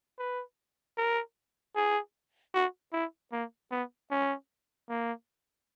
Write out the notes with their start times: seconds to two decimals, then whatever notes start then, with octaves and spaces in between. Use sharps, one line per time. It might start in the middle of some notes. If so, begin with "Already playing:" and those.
0.19 B4
0.97 A#4
1.75 G#4
2.54 F#4
2.93 E4
3.32 A#3
3.71 B3
4.11 C#4
4.89 A#3